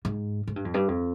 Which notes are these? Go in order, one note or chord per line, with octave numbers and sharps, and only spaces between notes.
G#2
G#2
G2
F2
G2
F2